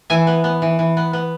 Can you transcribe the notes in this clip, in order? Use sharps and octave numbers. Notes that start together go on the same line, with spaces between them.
E3 E5 G#5
B3
B3
E3
E3
B3
B3